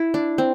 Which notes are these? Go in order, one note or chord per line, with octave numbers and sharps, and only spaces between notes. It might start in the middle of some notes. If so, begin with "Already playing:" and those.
Already playing: E4
D4
C4